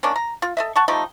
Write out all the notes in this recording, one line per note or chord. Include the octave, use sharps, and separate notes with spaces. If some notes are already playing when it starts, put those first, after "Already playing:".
D#3 A#3 C#4 D4
A#5
F4
A4 D#5 E5
F#5 A5 C#6
F3 G3 A3 D#4